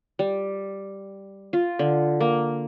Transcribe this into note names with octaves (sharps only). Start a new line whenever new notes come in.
G3
F4
D3
A#3